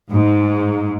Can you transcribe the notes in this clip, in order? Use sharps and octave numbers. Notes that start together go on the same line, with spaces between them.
G#2